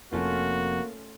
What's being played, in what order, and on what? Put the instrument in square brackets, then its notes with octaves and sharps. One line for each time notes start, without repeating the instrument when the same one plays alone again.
[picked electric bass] F1 F2 [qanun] A3 C#4 F4 [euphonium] A#3 [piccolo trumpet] F#4